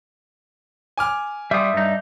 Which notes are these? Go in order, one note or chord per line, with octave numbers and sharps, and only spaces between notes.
G#5 D6 F6
G3 F4 E5 D#6
G2 D#4